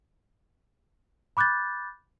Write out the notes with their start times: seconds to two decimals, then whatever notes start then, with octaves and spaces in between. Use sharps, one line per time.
1.37 B5 D6 F#6 G6 A6